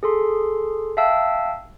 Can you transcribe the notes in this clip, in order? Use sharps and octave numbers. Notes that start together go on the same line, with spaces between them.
G#4 A4 C6
E5 F5 G5 A5 E6